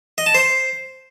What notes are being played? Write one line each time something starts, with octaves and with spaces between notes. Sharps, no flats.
D#5
A5
C5